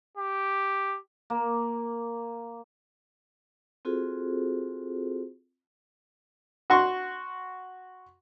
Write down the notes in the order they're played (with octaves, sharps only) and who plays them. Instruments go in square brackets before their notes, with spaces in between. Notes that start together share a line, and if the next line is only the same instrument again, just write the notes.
[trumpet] G4
[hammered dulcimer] A#3
[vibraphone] C4 F4 F#4 G#4 A4 C5
[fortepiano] F#4 F#5 C6 C#6